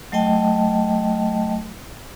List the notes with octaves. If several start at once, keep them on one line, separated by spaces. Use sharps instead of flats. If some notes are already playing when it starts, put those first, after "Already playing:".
F#3 A3 D#5 G5 A5